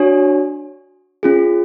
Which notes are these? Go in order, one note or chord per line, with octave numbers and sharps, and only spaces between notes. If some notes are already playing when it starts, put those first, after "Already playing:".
Already playing: D4 F#4 C#5 G#5
C#4 F4 G#4